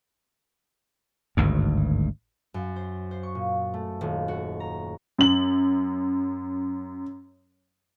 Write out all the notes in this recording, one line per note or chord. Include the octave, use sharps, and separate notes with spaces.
G#1 D2 G2
F#2
C5
C5
C#6
A#2
A3
D#1
F#4
A#5
F#2 F#7